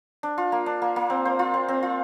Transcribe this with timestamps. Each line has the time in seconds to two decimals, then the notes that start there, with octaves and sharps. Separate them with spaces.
0.23 D4
0.38 F4
0.52 A#3
0.66 D4
0.82 A#3
0.96 A#3
1.10 C4
1.25 C5
1.39 F4
1.54 C4
1.68 C4
1.83 F4